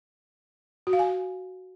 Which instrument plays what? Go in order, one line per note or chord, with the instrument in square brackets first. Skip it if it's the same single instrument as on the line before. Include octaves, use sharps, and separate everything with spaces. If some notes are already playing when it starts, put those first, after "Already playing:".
[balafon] F#4
F5
G#5